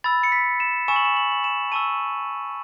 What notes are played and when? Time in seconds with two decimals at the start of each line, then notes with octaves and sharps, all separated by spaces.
0.04 B5 E6 A6
0.23 C#7
0.32 B6
0.60 E7
0.88 G#5 C#6 E6 E7
0.96 F#7
1.05 E7
1.17 F#7
1.32 F#7
1.44 E7
1.72 A5 C#6 E6 D#7